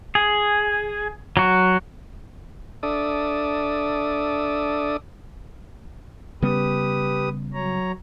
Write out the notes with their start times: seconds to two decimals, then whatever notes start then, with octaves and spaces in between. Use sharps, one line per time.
0.15 G#4
1.37 F#3 F#4
2.83 D4 A4 D5 E5 D#6
6.42 C#3 G3 B3 G4 B4 D#6
7.54 F#3 C#5 A#5